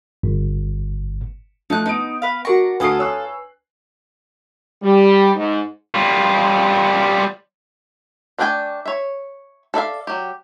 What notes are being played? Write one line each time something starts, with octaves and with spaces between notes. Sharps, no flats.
G1
F3 A3 D#4 F#6
B3 D#4 D7
B4 F5
D4 F#4 A#4 C#6 A#6
D2 F4 F#4 A4 B4 G#5 D#6 C7
C#5 E6 F#6
G3
G#2
G3 F4
A3 D4 D5 G5 G#5
C#5 E5
A4 D5 E5 F5
F#3 G4